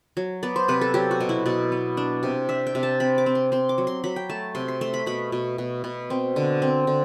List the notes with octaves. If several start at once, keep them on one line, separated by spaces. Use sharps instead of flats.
F#3
B3 D5
C5
C3 B4
A4
F#3 G4
F#4
B2
E4
B2 D5
B3
D4
C3
D4 E5
G5
C3
A5
C4 B5
D6
C4
C6
C4 C6
D6
F#3
C6
F#3 B5
G5
A3 A5
C3 C6
C6
A3 C6
B5
B2 B5
B2
B2
B2
C4
D3
C4
D3